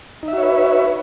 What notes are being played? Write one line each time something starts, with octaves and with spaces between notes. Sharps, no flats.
D#4 F#4 B4 C#5 E5